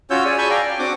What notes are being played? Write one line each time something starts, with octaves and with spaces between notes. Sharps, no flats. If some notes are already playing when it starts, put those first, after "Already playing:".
C#4 F4 F#4 C#5 E6 G6
G#4 D5 G#5
G#5 A5 B5 C#6 E6 G6
D5 F5 G5 A#5 F6
G5
C4 D4 F#4 F#5 D6